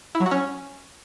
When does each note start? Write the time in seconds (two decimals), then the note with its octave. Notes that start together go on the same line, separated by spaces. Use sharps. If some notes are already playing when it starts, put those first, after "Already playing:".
0.15 E4
0.20 F#3
0.26 F#4
0.31 C#4